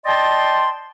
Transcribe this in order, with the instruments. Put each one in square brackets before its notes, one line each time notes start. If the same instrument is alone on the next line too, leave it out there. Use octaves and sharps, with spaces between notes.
[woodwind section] D5 D#5 G5 A5 C6